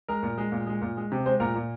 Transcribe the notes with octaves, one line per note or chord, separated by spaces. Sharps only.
G#3 A#4
A#2
G#3
A#2
G#3
A#2
G#3
C3
G#3 C5
A#2 A#4
A#2